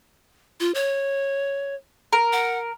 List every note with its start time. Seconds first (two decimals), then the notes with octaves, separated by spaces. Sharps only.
0.60 F4
0.75 C#5
2.13 A#4
2.33 F#5